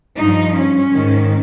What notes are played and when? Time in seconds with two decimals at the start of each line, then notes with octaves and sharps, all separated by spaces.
0.18 G2 F3 D#4
0.56 C#4
0.93 G#2 D#3